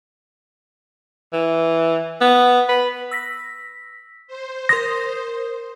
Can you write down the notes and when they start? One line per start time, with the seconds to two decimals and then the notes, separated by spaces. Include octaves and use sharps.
1.33 E3
2.21 B3
2.69 B4
3.11 E6 A#6 B6
4.28 C5
4.69 A#4 C6 D#6 A#6